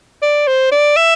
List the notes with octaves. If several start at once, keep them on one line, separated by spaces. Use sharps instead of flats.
D5
C5
D5
E5